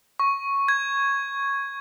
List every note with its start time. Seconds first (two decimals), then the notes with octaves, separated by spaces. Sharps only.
0.20 C#6
0.68 G#6